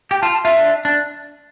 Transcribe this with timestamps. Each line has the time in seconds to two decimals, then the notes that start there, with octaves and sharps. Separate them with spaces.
0.11 G4 G5
0.22 F4 A5
0.33 A5
0.44 F4 E5
0.56 D4
0.85 D4